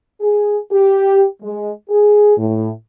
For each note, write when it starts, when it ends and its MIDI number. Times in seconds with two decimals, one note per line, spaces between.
0.21 0.57 68
0.72 1.25 67
1.42 1.71 56
1.90 2.36 68
2.37 2.70 45